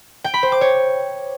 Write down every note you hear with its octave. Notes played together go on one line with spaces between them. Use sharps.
G5
B5
C5
D6
C#5